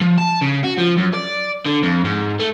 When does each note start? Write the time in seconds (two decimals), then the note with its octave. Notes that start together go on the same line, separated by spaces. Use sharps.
0.01 F3
0.18 A5
0.41 C#3
0.64 F#4
0.78 F3
0.97 F#2
1.14 D5
1.66 D3
1.83 F2
2.04 G#2
2.39 A3